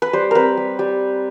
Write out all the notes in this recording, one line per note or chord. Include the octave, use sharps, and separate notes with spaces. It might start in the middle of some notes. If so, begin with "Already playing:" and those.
B4
G3 C5
C4 A#4 B4
G3
G3